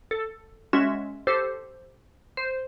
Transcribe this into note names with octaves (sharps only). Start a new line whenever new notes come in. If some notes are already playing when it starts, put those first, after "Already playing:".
A4
G#3 C#4 F#4 E5
G4 A4 C5
C5